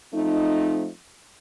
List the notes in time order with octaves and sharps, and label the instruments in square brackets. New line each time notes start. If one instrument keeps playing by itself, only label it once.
[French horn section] F3 A3 C4 D#4